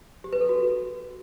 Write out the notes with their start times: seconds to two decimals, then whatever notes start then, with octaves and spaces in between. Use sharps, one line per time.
0.24 G4
0.33 B4
0.41 A4
0.49 F#4